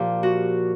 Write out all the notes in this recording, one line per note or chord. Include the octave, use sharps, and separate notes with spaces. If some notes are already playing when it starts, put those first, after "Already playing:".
Already playing: A#2 F3 G4
F#4